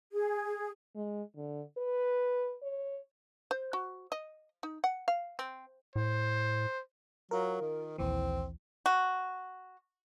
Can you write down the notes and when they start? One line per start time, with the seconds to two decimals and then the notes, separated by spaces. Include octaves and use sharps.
0.12 G#4
0.96 G#3
1.37 D3
1.78 B4
2.63 C#5
3.51 C5
3.73 F#4
4.12 D#5
4.63 D#4
4.84 F#5
5.08 F5
5.39 C4
5.96 A2 C5
7.31 F#3 F4 A#4
7.61 D#3
7.98 A#1 D#2 E3 C4
8.86 F#4